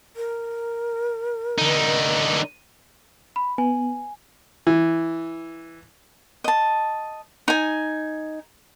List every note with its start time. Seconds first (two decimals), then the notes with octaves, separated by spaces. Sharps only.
0.16 A#4
1.58 D3 D#4
3.36 B5
3.58 B3 G#5
4.67 E3
6.44 D#5 A5
7.48 D#4 G#5